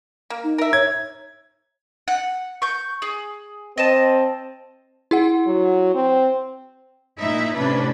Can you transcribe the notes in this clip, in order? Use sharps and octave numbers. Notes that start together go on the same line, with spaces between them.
A#3
D#4
A#4 E5
C#5 G#6
F#5
C#6 G6
G#4
C4 D#5 A5
E4 G#4 F#5
F#3
C4
A#2 D#4 E4 E5
A2 C3 C#4 D4 B4